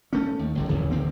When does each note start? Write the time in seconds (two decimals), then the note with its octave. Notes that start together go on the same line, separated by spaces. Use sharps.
0.13 A3 C#4
0.39 D#2
0.55 G1 C#2 A#2
0.69 D1 A1 D#2 C#3
0.91 E1 D2 A#3 C4